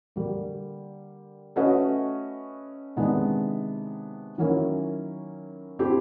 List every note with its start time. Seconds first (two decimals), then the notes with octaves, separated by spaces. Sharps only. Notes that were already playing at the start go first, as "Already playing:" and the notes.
0.16 D3 G3 A#3
1.56 A3 C#4 F#4 B4 D#5
2.96 C3 D#3 G#3 B3 D4
4.38 D#3 F#3 A#3 C#4 E4
5.79 A3 C4 E4 G4